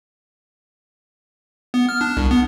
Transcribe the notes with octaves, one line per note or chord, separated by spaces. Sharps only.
B3
F6
D4
C2
B3